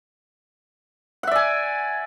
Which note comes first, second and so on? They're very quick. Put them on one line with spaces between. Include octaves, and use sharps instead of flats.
F#5 E5 D5 G#5